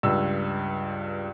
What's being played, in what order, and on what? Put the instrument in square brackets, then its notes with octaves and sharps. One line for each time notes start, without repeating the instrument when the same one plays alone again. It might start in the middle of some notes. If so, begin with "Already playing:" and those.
[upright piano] C#2 G2 E6